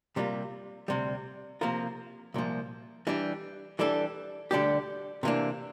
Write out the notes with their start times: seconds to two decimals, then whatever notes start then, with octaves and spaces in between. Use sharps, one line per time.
0.16 C3 G3 A#3 F4
0.88 D2 C3 G3
1.61 C3 F3 A#3 F4 A#4
2.34 C2 A#2 F3
3.07 E3 G3 D4
3.79 E3 G3 D4 A4
4.51 D2 D3 G3 D4 G4
5.23 C3 E3 A#3 D4